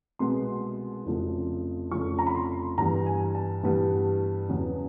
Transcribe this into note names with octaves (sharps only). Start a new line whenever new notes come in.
C2 B2 G#3 B3 C6
F1 F2 C#3 F3
F1 F2 C#3 F3 C#6
A#5
B5
C6
G2 E3 G3 B3 A#5
G#5
A5
G2 E3 G3 B3
E2 C#3 F#3 B3